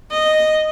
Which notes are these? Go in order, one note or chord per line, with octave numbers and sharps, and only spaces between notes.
D#5